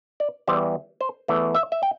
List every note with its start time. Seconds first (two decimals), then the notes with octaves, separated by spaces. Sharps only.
0.20 D5
0.47 E2 E3 G3 C5
1.01 C5
1.28 E2 E3 A3
1.55 E5
1.72 E5
1.83 G5